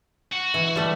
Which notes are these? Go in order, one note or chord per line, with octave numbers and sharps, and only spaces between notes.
F#4
E3
G3 A3